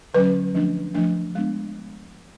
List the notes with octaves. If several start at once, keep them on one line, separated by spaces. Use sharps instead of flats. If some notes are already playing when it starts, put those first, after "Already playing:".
D3 F#3 C#4 B4
F3 A3 D4
F3 A3 D4
G#3 B3 D4